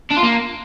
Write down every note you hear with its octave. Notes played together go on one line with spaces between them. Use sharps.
D4
F4
A#3